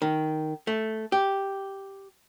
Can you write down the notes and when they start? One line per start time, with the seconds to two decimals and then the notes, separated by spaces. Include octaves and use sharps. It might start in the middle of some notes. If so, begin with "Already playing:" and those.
0.02 D#3
0.67 A3
1.12 G4